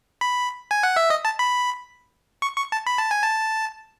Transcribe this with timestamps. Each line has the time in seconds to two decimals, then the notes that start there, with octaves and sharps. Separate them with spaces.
0.21 B5
0.71 G#5
0.83 F#5
0.96 E5
1.10 D#5
1.25 A5
1.39 B5
2.42 C#6
2.57 C#6
2.72 A5
2.86 B5
2.98 A5
3.11 G#5
3.23 A5